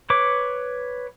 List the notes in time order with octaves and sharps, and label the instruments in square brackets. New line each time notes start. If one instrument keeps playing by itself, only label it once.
[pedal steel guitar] B4 C#5 D6